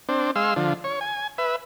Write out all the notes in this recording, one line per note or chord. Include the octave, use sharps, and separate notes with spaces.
C4 D4
G#3 F5 C6 E6
D3 F3
C#5
G#5
B4 E5